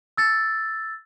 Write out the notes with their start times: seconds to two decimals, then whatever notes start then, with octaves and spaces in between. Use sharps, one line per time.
0.17 E6 A6